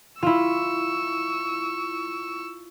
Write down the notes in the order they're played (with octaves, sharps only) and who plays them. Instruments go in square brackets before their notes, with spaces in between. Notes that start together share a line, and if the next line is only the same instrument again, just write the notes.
[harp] E4 F4 [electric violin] C#6 E6